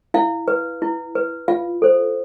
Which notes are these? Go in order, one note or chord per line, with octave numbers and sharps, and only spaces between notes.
E4 F5
B4
E4
B4
F4 F5
A4 C5